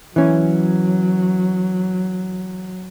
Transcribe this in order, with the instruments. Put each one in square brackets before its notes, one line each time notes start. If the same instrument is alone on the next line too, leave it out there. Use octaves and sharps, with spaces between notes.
[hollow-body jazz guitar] E3 C#4 [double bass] F#3